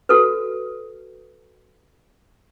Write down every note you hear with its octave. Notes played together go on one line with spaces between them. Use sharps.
F#4 A4 B4